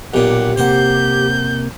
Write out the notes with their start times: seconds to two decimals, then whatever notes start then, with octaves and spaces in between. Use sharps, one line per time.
0.14 B1 A#2 G4 F#5
0.57 C3 A#3 C5 F#5 G6